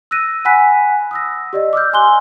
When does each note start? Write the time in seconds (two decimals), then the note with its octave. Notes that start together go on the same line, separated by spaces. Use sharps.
0.11 E6 F#6 A#6 D#7
0.45 F#5 G#5 B5 F#6 B6
1.11 D#6 E6 A#6
1.53 G4 D5 D#5
1.73 D6 E6 F6 G6
1.93 G#5 C6 F#6 G7